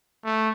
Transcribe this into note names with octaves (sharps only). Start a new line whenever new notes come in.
A3